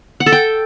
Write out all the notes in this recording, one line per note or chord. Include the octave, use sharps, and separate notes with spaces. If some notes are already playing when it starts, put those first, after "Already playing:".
F#5
A4
G5